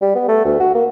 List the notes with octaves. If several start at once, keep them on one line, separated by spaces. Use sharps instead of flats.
G3
B3
A3
D2
F#4
A#3